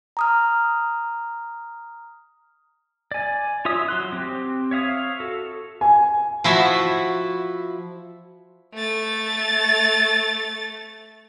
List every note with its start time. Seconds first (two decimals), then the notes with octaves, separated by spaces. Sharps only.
0.17 A#5 D#6 F6
3.11 D5 G#5
3.65 F4 C#5 E5 D#6
3.89 F#3 C6 F#6
4.12 C4 G4
4.71 C#5 E5 F5 D#6
5.20 F#4 A4
5.81 G#5
6.44 F3 E4 F#4 E5
8.74 A3 A6